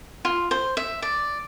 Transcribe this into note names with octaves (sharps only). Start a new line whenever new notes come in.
F4
C5
E5
D5